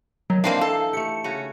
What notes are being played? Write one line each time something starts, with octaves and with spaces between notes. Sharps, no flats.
D#3 F#3
E3 A#3 C4 D4 D#4 C5 F5
A4
A3 G4 C#7
C#3 C#4 F#4